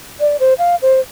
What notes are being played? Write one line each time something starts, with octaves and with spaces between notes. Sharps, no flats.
D5
C5
F5
C5